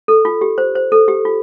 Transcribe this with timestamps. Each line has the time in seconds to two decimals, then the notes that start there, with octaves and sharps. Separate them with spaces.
0.08 A4
0.25 F4
0.41 G4
0.58 C5
0.75 C5
0.92 A4
1.08 G4
1.25 F4